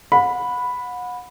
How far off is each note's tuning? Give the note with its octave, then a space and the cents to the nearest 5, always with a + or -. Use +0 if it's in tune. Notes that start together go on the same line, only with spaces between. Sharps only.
F#5 -35 B5 +0